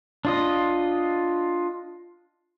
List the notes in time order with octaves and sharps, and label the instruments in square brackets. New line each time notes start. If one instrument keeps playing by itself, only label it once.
[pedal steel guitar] D4 F4 D#5